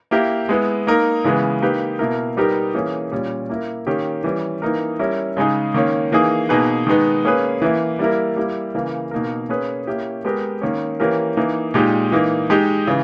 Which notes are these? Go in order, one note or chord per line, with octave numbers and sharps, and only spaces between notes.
A#3 E4 G4 A#4
G#3 B3 E4
A#3 D#4 A#4
C#3 E3 G#3 B3
A#3 D#4 G4 B4
B2 A#3 E4 A#4
G3 B3 D#4 G4 A#4
E3 A#3 C#4 G#4
A#2 G3 C#4
A#3 E4 A#4
D#3 A#3 C#4 G4
E3 G3 C#4
E3 A#3 D#4 A#4
G3 C#4 E4 A#4
C#3 G#3 D#4 G#4
D#3 A#3 C#4
E3 A#3 D#4 G#4
B2 A#3 D#4 G#4 B4
D#3 G#3 B3 D#4
A#3 C#4 G#4 B4
E3 A#3 E4
G3 A#3 E4 A#4
G3 A#3 E4
C#3 E3 A#3
B2 A#3 D#4 A#4
A#3 C#4 G#4 B4
A#3 C#4 E4 G4
G#3 B3 G4 A#4
D#3 A#3 C#4
E3 A#3 C#4 G4 A#4
E3 A#3 D#4
A#2 G#3 D#4 G4
E3 A#3 D#4
G#3 D#4 G4
C#3 E3